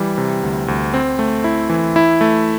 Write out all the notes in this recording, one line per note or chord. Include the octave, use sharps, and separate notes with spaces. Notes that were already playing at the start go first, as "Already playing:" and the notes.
Already playing: E3 G3
C3
D2
D2
C4
A3
E4
E3
E4
A3